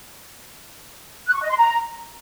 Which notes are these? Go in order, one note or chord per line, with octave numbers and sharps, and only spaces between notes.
F#6
C#6
D#5
C6
A#5